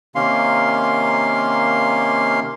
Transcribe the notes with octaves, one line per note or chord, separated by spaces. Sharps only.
C3 D#3 A#3 C#4 F5 C6